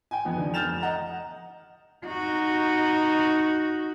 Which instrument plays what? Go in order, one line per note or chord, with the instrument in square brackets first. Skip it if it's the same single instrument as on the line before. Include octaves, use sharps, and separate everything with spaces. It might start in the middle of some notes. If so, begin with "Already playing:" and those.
[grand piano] G5 G#5
F2 B3 D#4
F2 D3
F6 G6 A6 E7 F7
F1
D#5 F#5 A#5
[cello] D#4 F#4